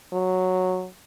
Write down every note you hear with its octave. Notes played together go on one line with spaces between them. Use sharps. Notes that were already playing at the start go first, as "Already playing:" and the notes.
F#3